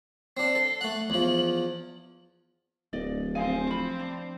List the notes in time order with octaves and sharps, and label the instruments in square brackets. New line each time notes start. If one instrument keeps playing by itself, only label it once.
[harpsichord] C4 D4 [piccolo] C7
[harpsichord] A4
[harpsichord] A3 F#5 [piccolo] F#7
[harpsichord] E2 F3
[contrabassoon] D1 [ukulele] D5 D#5
[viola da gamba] F3 C4 [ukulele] D#4 F5 G#5
[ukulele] F4 B5
D4